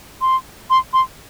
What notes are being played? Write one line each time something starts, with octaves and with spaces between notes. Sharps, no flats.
C6
C6
C6